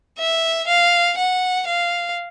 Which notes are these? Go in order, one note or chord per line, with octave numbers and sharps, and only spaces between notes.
E5
F5
F#5
F5